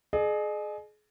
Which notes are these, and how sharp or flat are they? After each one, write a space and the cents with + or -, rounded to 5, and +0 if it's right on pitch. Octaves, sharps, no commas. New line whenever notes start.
G#4 +30 D#5 -40